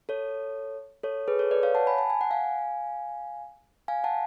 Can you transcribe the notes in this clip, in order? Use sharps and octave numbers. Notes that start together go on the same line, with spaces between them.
A4 C#5
A4 C#5
G#4 B4
A4 C#5
B4 D5
C#5 F5
F#5 A5
G#5 B5
A5
G#5
F#5
F5 G#5
F5 G#5
F#5 A5